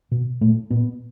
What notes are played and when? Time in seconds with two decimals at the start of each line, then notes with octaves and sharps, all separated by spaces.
0.11 B2
0.41 A#2 A3
0.70 A#2 B3